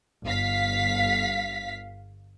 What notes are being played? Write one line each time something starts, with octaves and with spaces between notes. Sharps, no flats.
G1 F5 B6